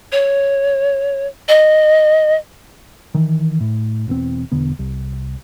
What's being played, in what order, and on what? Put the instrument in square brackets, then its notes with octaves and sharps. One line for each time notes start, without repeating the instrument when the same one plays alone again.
[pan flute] C#5
D#5
[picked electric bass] D#3 E3
A2
E1 E2 C4
E1 D3 B3
C2